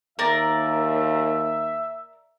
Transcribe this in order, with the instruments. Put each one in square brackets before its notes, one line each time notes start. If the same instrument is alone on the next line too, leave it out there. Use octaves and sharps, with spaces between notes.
[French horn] D#2 [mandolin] A#4 D5 [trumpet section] E5